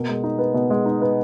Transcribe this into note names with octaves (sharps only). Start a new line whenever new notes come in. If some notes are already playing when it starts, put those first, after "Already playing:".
Already playing: B2 A#3
G#3
D#4
B3
B2
G#3
D#4
B3